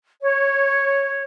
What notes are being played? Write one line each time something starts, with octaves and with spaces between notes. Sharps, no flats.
C#5